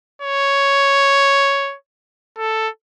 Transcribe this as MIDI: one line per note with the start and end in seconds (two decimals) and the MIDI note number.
0.22 1.76 73
2.38 2.69 69